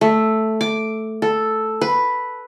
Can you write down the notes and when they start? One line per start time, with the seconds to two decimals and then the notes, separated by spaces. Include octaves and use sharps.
0.01 A3
0.61 D6
1.22 A4
1.81 B4